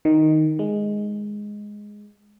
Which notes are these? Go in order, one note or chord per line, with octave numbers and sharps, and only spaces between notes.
D#3
G#3